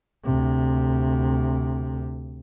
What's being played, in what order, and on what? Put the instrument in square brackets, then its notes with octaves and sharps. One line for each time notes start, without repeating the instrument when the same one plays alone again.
[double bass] D2 C3